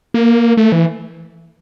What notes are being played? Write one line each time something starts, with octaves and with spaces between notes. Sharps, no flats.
A#3
A3
E3